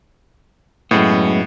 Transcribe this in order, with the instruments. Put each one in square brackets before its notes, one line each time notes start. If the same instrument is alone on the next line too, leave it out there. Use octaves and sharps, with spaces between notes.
[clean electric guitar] F#2 G#3 B3 [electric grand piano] A2